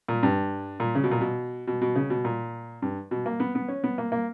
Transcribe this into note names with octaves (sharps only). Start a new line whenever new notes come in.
A#2
G2
A#2
C#3
B2
A#2
B2
B2
B2
C#3
B2
A#2
G2
B2
A#3
B3
B3
C#4
B3
A#3
A#3